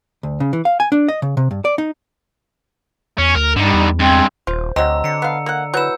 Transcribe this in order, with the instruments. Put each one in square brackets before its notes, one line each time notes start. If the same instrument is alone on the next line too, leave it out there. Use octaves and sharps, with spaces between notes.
[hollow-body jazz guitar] D2
C#3
E3
F5
G#5
D4
D#5
C#3
C3
G2
D5
D#4
[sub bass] E2 [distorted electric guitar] C#4
[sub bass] D2 [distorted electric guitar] A#4
[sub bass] G2 [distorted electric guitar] D3 D#3 [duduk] G3
[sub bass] E2
[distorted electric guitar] G2 G#3 [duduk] C4
[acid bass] D#1 [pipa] F4 [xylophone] C5
[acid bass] D2 [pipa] F#3 C4 [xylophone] D#5 [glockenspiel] A#5 E6
[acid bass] D3 [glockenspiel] A#5 C#7
[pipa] B3 F5
A#3 F#5
[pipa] F#3 E4 [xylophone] B4 E7 [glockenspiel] E6 G6